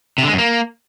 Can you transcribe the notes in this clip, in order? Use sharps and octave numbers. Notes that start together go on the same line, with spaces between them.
C3
D3
G#3
F#2
A#3